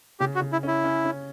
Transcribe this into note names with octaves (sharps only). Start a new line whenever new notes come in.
C#3 G4
F#4
C#3
E4
C#4 E4
C#4
C#4